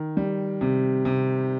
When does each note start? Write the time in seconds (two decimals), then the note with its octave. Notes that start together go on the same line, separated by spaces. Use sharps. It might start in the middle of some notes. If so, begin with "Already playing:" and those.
Already playing: D#3
0.17 G3
0.61 C3
1.05 C3